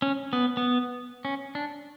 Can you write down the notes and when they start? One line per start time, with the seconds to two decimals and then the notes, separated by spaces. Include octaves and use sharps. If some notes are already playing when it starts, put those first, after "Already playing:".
0.02 C#4
0.33 B3
0.57 B3
1.25 C#4
1.55 D4